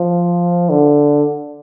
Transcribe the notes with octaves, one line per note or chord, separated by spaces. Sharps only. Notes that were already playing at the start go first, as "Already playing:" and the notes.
Already playing: F3
D3